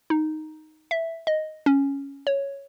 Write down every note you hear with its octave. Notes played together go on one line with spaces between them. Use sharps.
D#4
E5
D#5
C#4
C#5